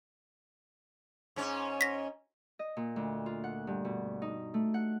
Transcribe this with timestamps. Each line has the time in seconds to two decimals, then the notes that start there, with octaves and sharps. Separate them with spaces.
1.36 G#2 C#4
1.81 A#6 B6
2.59 D#5
2.77 A#2
2.96 D2
3.26 F4
3.44 F#5
3.67 G2
3.85 B2
4.22 D#4
4.54 A3
4.74 F#5